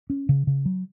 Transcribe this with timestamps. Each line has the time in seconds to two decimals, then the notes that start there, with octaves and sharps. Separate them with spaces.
0.10 C#4
0.29 C#3
0.47 C#3
0.66 F#3